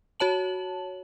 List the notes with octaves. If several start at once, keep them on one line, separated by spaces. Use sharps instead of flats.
F#4 C#5 A5 F#7